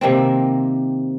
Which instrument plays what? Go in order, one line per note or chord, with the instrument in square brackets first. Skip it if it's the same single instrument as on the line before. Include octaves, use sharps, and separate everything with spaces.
[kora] C3 D#3 A#3 C4